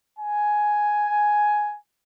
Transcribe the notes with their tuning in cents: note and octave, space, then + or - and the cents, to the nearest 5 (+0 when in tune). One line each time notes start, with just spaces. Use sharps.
G#5 +5